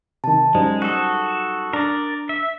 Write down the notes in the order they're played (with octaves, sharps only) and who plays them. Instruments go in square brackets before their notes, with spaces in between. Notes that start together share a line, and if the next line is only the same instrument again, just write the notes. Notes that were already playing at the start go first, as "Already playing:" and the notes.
[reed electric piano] C3 D#3 [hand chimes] A5
[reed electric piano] F#2 G3 D#4 [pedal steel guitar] G#3 [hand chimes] C5
[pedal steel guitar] F#4 A4 [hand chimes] D#6 F#6
[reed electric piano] D4 [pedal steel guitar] A#4 D5
[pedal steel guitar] E5